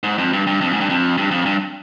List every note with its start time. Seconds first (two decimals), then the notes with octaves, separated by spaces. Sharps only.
0.03 G#2
0.18 F2
0.33 G2
0.47 G2
0.61 F2
0.73 G#2
0.81 G2
0.89 F2
1.18 G2
1.31 F2
1.45 G2